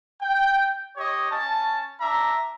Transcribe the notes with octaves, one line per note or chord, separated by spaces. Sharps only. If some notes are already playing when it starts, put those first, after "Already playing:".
G5
G4 C#5 D#5
C#4 A5
D4 E5 A#5